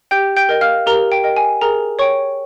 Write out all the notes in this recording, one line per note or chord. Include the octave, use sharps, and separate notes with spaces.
G4 G5 G6
G5 G6
A#4 D#5 G5
F5 F6
G4 A#4 A#5
G5
A#4 D#5 G5
G#5
G#4 A#4 A#5
C#5 G5 C#6